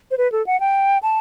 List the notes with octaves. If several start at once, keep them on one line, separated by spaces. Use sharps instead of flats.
C5
B4
A4
F#5
G5
A5